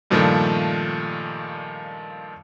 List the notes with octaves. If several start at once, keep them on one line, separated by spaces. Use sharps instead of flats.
G2 A#2 D#3 F3 G3 A3